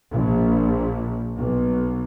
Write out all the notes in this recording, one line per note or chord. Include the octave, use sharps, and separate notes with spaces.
A#1
B1